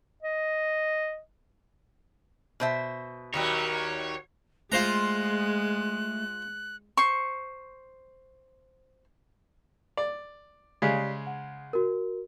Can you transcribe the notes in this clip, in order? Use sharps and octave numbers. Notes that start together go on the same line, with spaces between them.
D#5
B2 C5 E5
D#2 F#3 G3 C#5
G#3 A3 F4 C5 A#5 F#6
C5 C#6
D5
C#3 G#3 G4 D5 B6
F#5
F#4 A#4